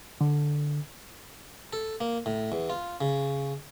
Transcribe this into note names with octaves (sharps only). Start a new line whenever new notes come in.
D3
A4
A#3
A2
E2
F4
C#3